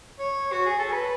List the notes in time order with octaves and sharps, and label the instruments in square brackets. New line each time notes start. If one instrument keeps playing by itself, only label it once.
[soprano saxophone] C#5
F#4
G#4
A4
B4